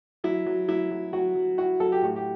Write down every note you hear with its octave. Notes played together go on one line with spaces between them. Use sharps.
F#3 E4
F#3
F#3 E4
F#3
F#3 F#4
F#3
E4 F#4
F#3 A4
G4
A2 F#4
G4